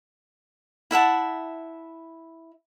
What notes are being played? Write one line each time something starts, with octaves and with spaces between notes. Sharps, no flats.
E4 E5 F#5 A5